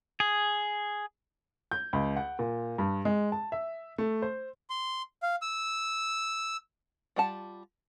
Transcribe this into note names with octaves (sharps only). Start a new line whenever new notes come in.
G#4
G6
C#2
F#5
A#2
G2
G#3
A5
E5
A3
C5
C6
F5
E6
G3 F4 F#5 A5